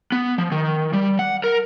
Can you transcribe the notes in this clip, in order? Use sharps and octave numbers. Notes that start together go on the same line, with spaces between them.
B3
F3
D#3
G3
F#5
A#4